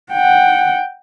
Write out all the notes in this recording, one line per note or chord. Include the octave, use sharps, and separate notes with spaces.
F#5 G5